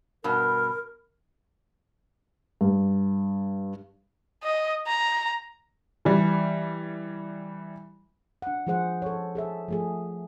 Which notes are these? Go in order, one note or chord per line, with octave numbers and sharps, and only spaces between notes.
G2 B2 A#4
G2
D#5
A#5
E3 G3
D4 F#5
F3 G#3 G#4 C5 F#5
A4 C#5
G#4 A4 E5
F3 A3 G#4